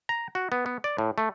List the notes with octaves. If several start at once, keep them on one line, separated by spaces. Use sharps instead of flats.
A#5
F#4
B3
B3
D5
A2
A3